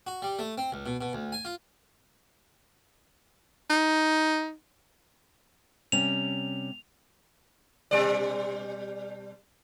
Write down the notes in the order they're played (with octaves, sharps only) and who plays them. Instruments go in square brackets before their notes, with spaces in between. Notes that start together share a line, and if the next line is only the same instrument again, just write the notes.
[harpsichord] F#4
G3
A3
C4
C#2
B2
B2
D2
G#5
F4
[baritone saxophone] D#4
[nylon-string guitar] C3 G3 C#4 [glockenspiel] F7
[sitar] B2 G3 D5